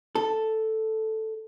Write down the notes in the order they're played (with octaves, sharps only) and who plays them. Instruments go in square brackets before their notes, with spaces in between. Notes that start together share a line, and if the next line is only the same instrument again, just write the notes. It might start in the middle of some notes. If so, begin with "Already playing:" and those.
[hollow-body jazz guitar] A4